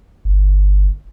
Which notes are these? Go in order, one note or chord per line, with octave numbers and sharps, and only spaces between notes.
G1